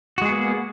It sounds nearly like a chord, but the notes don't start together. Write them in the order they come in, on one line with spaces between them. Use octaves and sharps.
F#4 G#3 G#4 B3 A#3